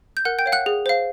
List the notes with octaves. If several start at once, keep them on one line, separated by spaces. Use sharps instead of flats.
G6
A#4 F#5 F#6
G5 G6
C#5 F5
F#5 F#6
G#4
C5 F5